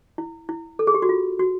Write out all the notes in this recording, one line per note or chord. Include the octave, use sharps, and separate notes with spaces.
E4
E4
A4
G#4
G4
F#4
F4
F#4